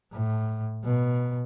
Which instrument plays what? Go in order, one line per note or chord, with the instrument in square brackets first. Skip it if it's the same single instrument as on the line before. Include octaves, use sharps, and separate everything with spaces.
[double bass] A2
B2